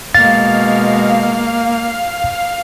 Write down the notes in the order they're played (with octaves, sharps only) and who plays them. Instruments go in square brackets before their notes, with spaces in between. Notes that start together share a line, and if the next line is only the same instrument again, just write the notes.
[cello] B2 G#3 [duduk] A#3 [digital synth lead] F5 [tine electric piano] A6